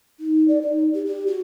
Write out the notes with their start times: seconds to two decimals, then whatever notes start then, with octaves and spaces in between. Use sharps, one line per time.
0.20 D#4
0.48 D5
0.62 D#4
0.94 G4
1.06 G4
1.27 F#4